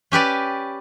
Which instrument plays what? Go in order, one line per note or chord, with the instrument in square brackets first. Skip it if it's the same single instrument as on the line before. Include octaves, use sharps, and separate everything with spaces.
[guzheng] C#4 G4 B4 D5